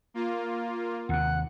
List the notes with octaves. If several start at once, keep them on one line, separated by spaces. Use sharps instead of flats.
A#3 F4
D#2 C3 F#5